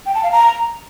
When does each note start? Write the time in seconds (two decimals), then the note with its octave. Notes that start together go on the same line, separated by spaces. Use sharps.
0.06 G5
0.15 A5
0.23 F5
0.32 A#5